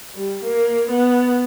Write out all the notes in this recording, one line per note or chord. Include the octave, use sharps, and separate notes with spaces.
G3
A#3
B3